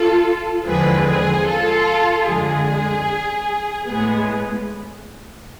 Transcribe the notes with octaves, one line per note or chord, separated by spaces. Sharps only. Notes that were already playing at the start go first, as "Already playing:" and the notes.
Already playing: F4 A4
E2 D3 F3 G#3 C4 G#4 B4
G#4
F4 A4
F2 D3 G#3 G#4
A2 G#3 B3 G#4